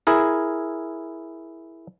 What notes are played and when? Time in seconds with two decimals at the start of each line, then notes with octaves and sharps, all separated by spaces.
0.07 E4 G#4 A#4